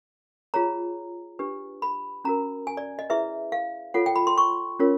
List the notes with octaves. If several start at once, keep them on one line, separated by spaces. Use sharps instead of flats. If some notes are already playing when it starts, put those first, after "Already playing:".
F4 G#4 C#5 A#5
D4 G4 B4
B5
C#4 F#4 A#4 A#5
G#5
D5
D#5
E4 G#4 B4 E5
F5
F4 A4 C#5 F#5
G5
B5
C6
C#6
C#4 F4 A#4 C#5